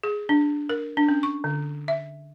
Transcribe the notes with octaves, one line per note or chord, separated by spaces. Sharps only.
G#4
D4
A#4
D4
C#4
C#6
D3
E5